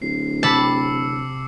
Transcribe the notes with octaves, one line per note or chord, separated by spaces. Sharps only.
D1 C7
C3 A5 B5 D6 E6 C#7